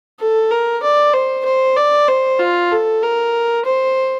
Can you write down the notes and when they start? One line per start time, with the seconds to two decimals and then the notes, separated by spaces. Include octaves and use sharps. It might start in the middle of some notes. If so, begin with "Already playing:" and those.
0.20 A4
0.51 A#4
0.83 D5
1.14 C5
1.45 C5
1.77 D5
2.08 C5
2.39 F4
2.71 A4
3.03 A#4
3.65 C5